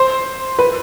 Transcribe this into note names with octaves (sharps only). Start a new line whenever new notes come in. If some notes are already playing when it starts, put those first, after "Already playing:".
Already playing: C5
B4